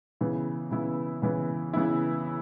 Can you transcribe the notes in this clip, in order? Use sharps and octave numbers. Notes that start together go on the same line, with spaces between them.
C#3 E3 B3 E4
C#3 E3 B3 E4
C#3 E3 B3 E4
C#3 E3 B3 E4